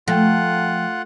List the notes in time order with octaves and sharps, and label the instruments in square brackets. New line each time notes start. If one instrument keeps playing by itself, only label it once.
[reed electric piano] F3 G5 [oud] A3 [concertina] F4 F#5